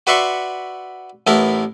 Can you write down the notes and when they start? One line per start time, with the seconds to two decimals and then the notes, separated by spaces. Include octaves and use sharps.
0.07 F#4 B4 D5 E5 C6 C#6
1.27 A1 A3 B3 E4 A#4